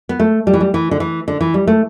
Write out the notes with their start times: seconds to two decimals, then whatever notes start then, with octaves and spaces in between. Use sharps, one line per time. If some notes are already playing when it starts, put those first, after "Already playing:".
0.09 B3
0.20 A3
0.47 G3
0.54 E3
0.61 G3
0.74 E3
0.91 D3
1.00 E3
1.28 D3
1.41 E3
1.54 G3
1.67 A3